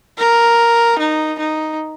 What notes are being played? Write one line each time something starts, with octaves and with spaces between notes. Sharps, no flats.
A#4
D#4
D#4